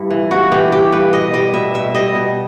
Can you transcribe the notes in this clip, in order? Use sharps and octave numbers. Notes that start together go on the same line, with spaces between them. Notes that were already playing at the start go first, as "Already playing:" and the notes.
Already playing: G2 G3 E4
E3
G2 F#4
E3 G4
G2 G4
G2 B4
B2 D#5
G3 D#5
B2 E5
B2 E5
G3 D#5
B2